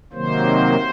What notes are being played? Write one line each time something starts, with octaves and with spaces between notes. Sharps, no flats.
C3 D#3 F#3 A#3 C5